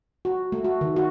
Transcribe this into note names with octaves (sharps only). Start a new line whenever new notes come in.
F#4
A3
F#4
D#3
F#4